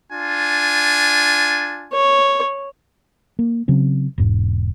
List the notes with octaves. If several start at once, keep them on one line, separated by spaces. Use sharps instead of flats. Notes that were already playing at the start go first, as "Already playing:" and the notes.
D4 F4 G#5
C#5
A#3
C#3 F#3 C4
E1 G#2